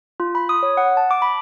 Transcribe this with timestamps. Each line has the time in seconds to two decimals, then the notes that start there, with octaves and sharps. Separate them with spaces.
0.20 F4
0.35 B5
0.49 D#6
0.63 C#5
0.77 F#5
0.97 A5
1.11 D6
1.22 B5